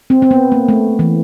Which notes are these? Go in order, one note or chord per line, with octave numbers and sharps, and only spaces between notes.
C4
C4
B3
A#3
A3
E3